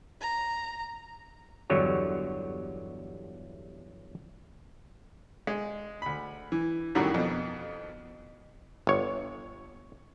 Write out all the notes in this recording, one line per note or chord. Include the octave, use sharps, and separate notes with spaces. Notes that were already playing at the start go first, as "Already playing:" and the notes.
A#5
G1 E2 D3 F#3 G3 C#5
G#3
D2 B5
E3
F#2 A2 D#3 F#3 G3 D4
F2 B2
G1 C#5